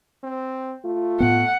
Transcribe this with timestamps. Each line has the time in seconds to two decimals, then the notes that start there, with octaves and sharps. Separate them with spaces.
0.23 C4
0.85 A3 F4
1.20 A2 B3 F#5